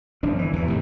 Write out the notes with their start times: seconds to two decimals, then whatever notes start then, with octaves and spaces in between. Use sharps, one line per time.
0.23 G1 F3 D4
0.39 E3
0.53 E2 E3
0.66 D#2 G#2 C3